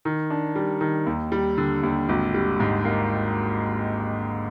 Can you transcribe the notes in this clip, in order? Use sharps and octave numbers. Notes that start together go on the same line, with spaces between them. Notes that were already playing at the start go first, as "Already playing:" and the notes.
D#3
D4
G3
D#3
D#2
G3
D3
D#2
G#1
G3
G#2
A#3